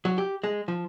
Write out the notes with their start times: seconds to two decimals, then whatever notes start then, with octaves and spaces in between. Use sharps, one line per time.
0.05 F#3
0.18 G4
0.44 G#3
0.68 F3